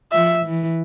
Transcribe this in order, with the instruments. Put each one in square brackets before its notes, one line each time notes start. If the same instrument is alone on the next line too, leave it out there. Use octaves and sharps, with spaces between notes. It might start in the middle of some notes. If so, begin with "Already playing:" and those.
[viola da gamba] F3 [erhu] E5
[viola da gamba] E3